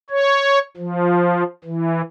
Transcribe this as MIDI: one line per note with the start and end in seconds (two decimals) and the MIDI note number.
0.10 0.59 73
0.77 1.44 53
1.64 2.02 52